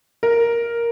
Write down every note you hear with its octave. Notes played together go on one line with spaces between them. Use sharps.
A#4